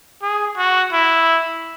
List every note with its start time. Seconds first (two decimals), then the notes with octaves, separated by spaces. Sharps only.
0.22 G#4
0.57 F#4
0.93 E4